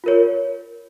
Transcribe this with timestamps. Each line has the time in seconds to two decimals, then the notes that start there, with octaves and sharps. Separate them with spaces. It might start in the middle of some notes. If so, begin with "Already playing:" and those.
0.04 F4 A#4 C#5